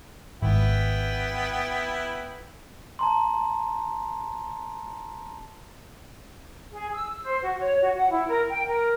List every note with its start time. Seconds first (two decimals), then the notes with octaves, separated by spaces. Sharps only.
0.42 G#1 B3 E4 G5
2.99 A5 A#5 C6
6.72 G#4
6.93 E6
7.23 C5
7.43 F#4
7.60 C#5
7.82 F#4
7.96 F#5
8.11 E4
8.28 A#4
8.50 G5
8.67 A#4